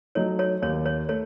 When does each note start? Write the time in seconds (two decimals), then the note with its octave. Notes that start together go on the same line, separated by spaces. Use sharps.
0.15 F#3 A3 D#4 C#5
0.39 C#5
0.62 D#2 C#5
0.86 C#5
1.09 A3 C#5